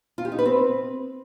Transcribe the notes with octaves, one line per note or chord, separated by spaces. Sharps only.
F4
G4
D#4
B4
C4